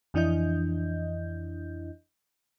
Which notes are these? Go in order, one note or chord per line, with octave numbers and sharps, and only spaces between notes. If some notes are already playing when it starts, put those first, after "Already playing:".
F2 E3 D4 E4 D#5 G6